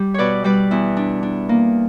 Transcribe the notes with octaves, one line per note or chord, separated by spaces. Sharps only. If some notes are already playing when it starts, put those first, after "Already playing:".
Already playing: G3 G4
B2 B4 C#5 D5
G3 B4 D5
E2 E4
D4
D4
A#3